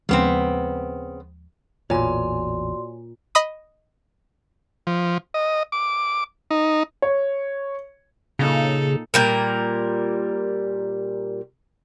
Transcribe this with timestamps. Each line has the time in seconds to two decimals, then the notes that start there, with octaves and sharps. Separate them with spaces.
0.09 D#2 C#3 F3 G#3 B3 C4
1.90 A1 E2 A#2 F#4 C#5 D5 G#5 C6
3.35 D#5 B5 D#6
4.87 F3
5.34 D#5
5.72 D6
6.51 D#4
7.02 C#5
8.39 A#2 C#3 D#4 A4
9.14 A#2 G3 A#4